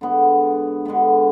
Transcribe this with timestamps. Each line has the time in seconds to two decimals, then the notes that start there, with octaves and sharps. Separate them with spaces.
0.01 D3 G#3 B3
0.85 D3 G#3 B3